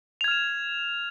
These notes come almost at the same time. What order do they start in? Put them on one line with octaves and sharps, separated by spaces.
F7 G#6 F6 E7